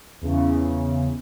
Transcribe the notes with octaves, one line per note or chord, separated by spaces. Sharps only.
E2 C#3